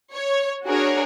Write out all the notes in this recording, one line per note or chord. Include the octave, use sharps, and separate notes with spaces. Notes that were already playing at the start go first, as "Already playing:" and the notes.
C#5
D4 F#4 G#4 A#4 C#5